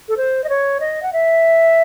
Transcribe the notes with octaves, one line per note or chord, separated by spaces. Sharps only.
A4
C5
D#5
C#5
D#5
F#5
E5